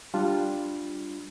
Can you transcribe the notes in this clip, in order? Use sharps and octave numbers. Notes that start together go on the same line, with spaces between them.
G3 D4 F4